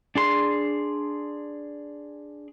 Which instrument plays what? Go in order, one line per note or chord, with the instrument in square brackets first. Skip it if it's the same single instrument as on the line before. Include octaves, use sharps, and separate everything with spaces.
[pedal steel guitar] D4 G#4 C6